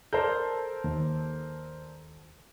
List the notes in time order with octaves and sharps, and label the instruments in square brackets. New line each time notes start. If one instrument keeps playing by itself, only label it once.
[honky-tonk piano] A4 [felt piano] A#4 C5 D5 [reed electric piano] G6
[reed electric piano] D#2